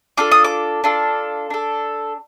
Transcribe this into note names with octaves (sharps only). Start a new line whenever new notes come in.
D4 F4 A4 D6
D#6
D6
D4 F4 A4
D4 A4